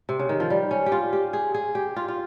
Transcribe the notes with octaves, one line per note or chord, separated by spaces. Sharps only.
C3
C#3
D#3
F3
G3
C#4
G4
F4
G4
G#4
G#4
G4
F4
F4